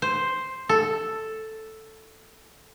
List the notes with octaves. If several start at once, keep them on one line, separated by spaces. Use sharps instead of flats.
C5
A4